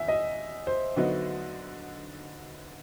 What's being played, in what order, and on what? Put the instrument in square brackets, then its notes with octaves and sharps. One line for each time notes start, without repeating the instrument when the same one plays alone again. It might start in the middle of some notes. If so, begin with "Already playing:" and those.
Already playing: [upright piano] E2 [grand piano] E5
[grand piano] D#5
C5
[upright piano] D3 F#3 B3 D#4